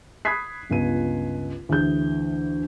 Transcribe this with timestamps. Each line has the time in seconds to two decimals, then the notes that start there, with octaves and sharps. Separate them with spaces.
0.25 B5 D#6 F#6 G#6 B6 C7
0.70 G1 C#2 D#7
1.69 D2 E3 G#4 G6